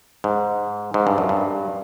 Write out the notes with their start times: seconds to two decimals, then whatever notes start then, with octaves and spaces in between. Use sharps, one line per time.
0.24 G#2
0.94 G#2
1.07 G2
1.18 F#2
1.29 G2